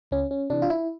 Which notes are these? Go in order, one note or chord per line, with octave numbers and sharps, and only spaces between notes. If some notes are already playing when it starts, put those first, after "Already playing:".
C#2 C#4
C#4
C3 E3 D4
F4
E4